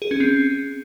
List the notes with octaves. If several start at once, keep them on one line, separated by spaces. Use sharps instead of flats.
G#4
C#4
C4